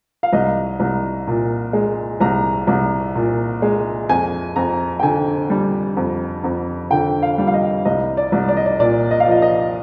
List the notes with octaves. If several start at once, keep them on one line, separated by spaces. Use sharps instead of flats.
F5
C2 D#5
C2
A#2
G#3
C2 A#5
C2
A#2
G#3
F2 G#5
F2 A#5
G5
D3 G#5
G3
F2
F2
D3 G5
F5
G3
F5
D#5
C2 D#5
D5
C2
D5
D#5
D5
A#2 D5
D#5
F5
F3 D#5
D#5